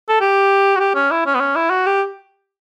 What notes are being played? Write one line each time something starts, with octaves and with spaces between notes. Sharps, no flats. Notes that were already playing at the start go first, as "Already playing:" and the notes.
A4
G4
F#4
G4
C#4
E4
C#4
B3
C#4
E4
F#4
G4